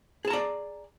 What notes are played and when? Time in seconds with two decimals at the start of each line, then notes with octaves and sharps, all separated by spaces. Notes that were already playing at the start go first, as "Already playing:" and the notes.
0.25 G#4
0.28 A5
0.30 A#5
0.33 D5